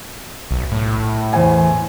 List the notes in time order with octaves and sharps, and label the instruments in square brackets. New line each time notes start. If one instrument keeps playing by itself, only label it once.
[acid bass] B1
A2
[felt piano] E2 C5 G#5